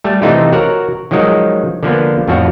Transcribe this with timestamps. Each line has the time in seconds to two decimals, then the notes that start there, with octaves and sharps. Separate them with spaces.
0.04 G3 A3
0.22 C3 E3 A3 D#4 F4 G4
0.52 F#4 A#4 C#5 F#5
1.11 D#3 F3 F#3 G#3 D#4
1.83 D3 F3 A#3 B3
2.28 F2 A2 F3 F#4 C#5